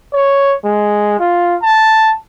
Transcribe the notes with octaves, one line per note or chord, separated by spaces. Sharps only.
C#5
G#3
F4
A5